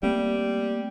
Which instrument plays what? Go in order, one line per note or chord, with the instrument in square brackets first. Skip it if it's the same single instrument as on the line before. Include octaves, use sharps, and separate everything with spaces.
[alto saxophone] G3 [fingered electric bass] A3 A#3 C4